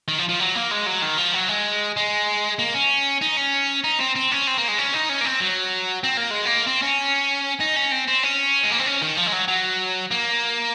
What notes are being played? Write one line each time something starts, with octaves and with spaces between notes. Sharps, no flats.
D#3
F3
F3
F#3
A#3
G#3
F#3
D#3
F3
F#3
G#3
G#3
A#3
C#4
D#4
C#4
D#4
C4
C4
C#4
C4
A#3
G#3
C#4
D#4
C#4
A#3
C4
F#3
C4
A#3
G#3
A#3
C4
C#4
D#4
C#4
C4
C4
C#4
G#3
A#3
C4
C#4
D#3
F3
G#3
F#3
F#3
A#3